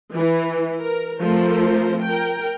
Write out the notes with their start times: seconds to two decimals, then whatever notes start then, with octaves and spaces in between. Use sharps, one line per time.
0.16 E3
0.81 A#4
1.20 F3 A3 C4 A4 A#4 C5
2.01 A#4 G5